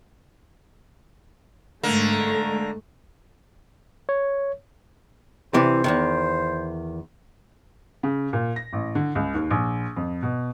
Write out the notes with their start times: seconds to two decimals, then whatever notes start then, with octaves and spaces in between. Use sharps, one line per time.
1.83 G#2 D3 A3 A#3
4.09 C#5
5.54 C3 E3 C5 D5
5.84 E2 G2 D#3
8.03 C#3
8.33 A#2
8.56 A#6
8.73 A1
8.95 D3
9.15 C#2
9.34 D#2
9.51 A#1
9.96 F2
10.22 B2